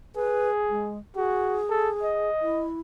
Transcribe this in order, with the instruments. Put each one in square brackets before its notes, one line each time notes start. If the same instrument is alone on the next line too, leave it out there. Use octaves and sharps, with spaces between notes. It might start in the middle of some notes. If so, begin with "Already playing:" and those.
[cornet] G#4 [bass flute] B4
[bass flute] G#3
[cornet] F#4 [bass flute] G#4
[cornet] A4
D#5
[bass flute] E4